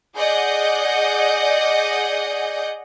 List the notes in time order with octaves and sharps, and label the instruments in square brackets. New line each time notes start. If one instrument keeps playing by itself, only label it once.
[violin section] G#4 D5 D#5 F#5 G6